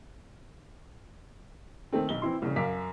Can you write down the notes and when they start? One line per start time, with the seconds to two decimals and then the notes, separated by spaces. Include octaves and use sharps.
1.93 D#3 A3 C4
2.09 B1 G7
2.22 E3 C4 E4 C6
2.42 C2 C#3
2.56 F#2 F5 D6 B6